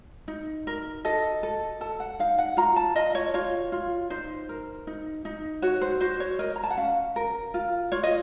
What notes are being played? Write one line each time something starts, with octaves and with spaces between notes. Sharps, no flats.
D#4
A#4
A4 D#5
A4
A4 A5
F#5
D#4 F5
F#5
F4 A#5
A5
F4 D#5
C#5
F4 C#5
F4
D#4 C5
A#4
D#4
D#4
F#4 C#5
C5
F#4 C5
C#5
A#4 D#5
A#5
A5
F#5
C#4 F5
A#4
F4
F4 C#5
D#5